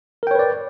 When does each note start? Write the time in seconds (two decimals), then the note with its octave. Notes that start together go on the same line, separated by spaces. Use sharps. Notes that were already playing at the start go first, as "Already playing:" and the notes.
0.23 A#4
0.27 G5
0.31 C#5
0.35 B4
0.39 D5